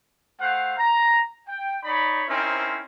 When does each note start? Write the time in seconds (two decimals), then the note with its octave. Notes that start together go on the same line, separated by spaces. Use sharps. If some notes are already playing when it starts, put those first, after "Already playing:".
0.40 A3 C5 F5 F#5
0.77 A#5
1.47 G5
1.83 D#4 C#5 D5 B5
2.28 C4 C#4 D#4 E4 A#4 C5